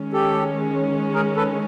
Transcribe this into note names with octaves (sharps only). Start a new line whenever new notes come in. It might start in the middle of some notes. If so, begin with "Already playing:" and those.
Already playing: D#3 G#3 C#4
G4 A4
G#4 A#4
A4 B4